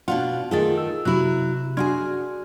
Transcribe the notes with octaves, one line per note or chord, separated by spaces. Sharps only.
B2 D4 F4 F#5
D#3 A3 F4 G#4 A4 A6
E6
C3 F#3 E4 F#6
D4 F#4 G#4 C6 F6 G#6